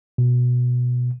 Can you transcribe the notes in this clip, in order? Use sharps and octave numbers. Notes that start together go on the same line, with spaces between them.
B2